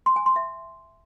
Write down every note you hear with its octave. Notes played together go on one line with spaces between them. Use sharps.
C6
G#5
C6
E5